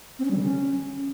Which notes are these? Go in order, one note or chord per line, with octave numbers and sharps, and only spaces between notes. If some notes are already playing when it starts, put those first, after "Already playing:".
C4
C#4
G3
D3
C#4